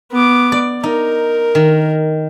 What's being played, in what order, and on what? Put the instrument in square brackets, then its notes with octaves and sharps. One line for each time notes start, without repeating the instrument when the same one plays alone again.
[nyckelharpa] B3 D6
[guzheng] D5
[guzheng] D#4 [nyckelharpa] A#4
[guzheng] D#3